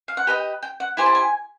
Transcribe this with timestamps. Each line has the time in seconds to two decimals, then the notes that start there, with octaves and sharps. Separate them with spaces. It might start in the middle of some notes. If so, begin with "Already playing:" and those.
0.08 F5
0.17 F#5
0.27 G4 B4 D#5 G5
0.63 G5
0.80 F#5
0.97 E4 G4 C5 G#5
1.06 A5
1.15 G#5